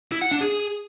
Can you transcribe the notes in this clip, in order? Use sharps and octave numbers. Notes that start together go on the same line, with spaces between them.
E4
F#5
D4
G#4